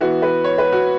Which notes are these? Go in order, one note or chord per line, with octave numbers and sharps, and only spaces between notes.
E3 B3 F#4
B4
C#5
B4
F#4